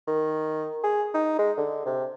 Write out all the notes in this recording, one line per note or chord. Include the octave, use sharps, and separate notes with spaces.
D#3
G#4
D#4
G#3
D3
C3